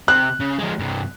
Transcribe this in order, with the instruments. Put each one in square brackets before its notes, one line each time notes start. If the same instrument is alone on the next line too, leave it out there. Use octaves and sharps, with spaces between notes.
[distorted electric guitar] C3 [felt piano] F#6
[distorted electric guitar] C#3
F3 G#3
G2 C3